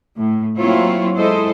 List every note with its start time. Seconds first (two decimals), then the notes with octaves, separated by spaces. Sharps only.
0.18 A2
0.58 F#3 A#3 C4 E4 F4 C#5
1.17 G#3 E4 A4 C5 D#5